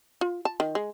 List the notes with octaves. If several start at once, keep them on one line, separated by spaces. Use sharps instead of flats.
F4
A5
D#3
G#3